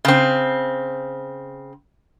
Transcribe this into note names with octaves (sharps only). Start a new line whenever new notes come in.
C#3 C4